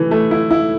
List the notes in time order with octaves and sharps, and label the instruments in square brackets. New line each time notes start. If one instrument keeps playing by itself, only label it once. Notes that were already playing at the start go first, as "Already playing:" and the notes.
Already playing: [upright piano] E3 A3 E4
A3
E4
E4